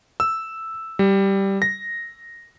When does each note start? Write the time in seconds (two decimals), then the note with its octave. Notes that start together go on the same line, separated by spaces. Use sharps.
0.20 E6
0.99 G3
1.62 A#6